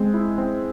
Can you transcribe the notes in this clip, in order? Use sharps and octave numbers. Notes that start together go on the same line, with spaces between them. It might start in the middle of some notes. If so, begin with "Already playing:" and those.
Already playing: G#3 C4
E4
C4